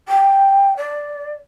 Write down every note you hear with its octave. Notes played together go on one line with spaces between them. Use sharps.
G5
D5